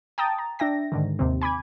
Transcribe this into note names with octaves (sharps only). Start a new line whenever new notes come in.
G5 A5 A#5 D#6 A6
A#5
D4 E5 G5 A#6
G#2 D3 D#3
D#2 C3 C4
G#5 B5 D6 G#6